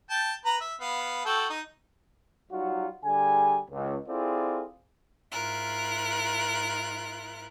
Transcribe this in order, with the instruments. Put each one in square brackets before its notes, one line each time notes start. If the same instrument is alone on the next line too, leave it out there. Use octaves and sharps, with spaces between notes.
[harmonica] G5 A5
B4 A#5
E5
B3 F5
F#4 A4 G5
D#4
[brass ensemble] F#3 G3 D#4 F4 F#4
D3 G3 G#4 G#5
C#2
C4 E4 F4 G#4 A4 D5
[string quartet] G#2 E4 F4 A#4 F#6